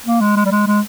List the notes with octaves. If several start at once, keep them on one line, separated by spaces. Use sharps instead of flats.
A#3
G#3
G#3
G3
G#3
G#3